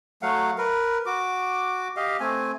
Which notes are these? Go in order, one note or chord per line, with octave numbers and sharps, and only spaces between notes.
F#3 A3 F5 F#5
A#4 B4
F#4 D6
G4 D#5 F5
A3 C4 G#5